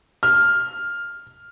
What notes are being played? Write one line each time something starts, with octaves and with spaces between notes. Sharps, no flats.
F6